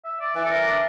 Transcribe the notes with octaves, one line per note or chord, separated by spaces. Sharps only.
E5
D5
E3 D5
A4
A#4
D4